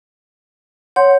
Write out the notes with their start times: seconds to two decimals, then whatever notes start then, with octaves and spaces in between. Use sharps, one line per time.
0.96 C#5 F#5 C6 G6